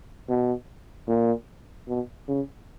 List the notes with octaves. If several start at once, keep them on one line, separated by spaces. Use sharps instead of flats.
B2
A#2
B2
C#3